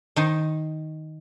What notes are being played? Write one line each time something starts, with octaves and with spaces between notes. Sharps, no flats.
D#3 D#4 C5